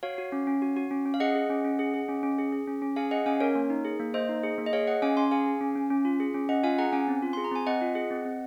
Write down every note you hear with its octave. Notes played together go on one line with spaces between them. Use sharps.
F#4 C#5 F5
F#4
C#4
C#4
F#4
F#4
C#4
C#4
F5
G#4 D#5 F#5
G#4
C#4
C#4
G#4
G#4
C#4
C#4
G#4
G#4
C#4
C#4
G#4 F5 G#5
G#4 D#5 F#5
C#4 F5 G#5
C#4 A#4 C#5
A#3
D#4
G#4
A#3
A#3 C5 D#5
D#4
G#4
A#3
D#5
G#4 C#5 F5
G#4 D#5 F#5
C#4 F5 G#5
C#4 G#5 C6
G#4 F5 G#5
G#4
C#4
C#4
C#4
F4
G#4
C#4
C#4 D#5 F#5
F4 F5 G#5
G#4 F#5 A#5
C#4 F5 G#5
C4
F4
G#4 C6
A#5
C4 G#5
C4 D#5 F#5
F4
G#4
C4
C4